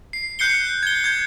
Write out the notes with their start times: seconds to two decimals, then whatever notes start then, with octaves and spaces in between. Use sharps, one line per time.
0.13 C7
0.39 F#6 G6 C7 C#7 G7
0.83 G#6 G7
1.04 G6 G#6